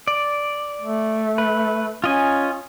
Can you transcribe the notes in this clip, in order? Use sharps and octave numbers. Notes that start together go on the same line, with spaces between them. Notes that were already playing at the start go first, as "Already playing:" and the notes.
D5
A3
B4
C#4 F4 D#5 G#5